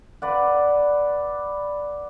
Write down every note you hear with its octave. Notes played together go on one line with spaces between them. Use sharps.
B4 D5 F#5